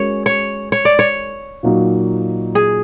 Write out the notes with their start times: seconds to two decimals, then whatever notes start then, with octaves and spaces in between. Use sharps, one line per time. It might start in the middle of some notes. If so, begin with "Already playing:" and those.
Already playing: G#3 C#4 F#4 A#4 C#5
0.26 C#5
0.72 C#5
0.85 D5
0.99 C#5
1.63 A#2 F#3 A#3 D#4 F#4
2.55 G#4